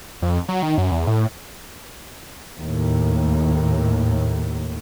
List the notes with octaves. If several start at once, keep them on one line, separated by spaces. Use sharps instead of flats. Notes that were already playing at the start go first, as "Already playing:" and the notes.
F2
F#3
D#3
F#2
E2
A2
D#2 A2